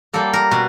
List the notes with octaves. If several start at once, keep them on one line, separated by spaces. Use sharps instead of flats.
G3 A#3 A4
A#4
B2 B4